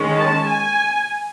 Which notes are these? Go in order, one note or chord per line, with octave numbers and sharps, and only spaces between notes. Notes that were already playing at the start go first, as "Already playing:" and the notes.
Already playing: D#3 G#3 C#4
A5
G#5